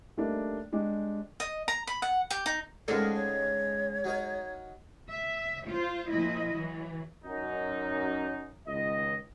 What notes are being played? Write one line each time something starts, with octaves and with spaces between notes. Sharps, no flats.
G3 A3 A#3 D4 D#4
G3 G#3 D4 G4
D#5
A#5
B5
F#5
G4
D#4
C#2 G#2 G#3 D4 A4 A#4
C#5
F#3 D#4 A#4
E5
F4 C5
A#2 F3 E4 D#5
E3 F#3
F#2 D#4
C#2 D#3 D#5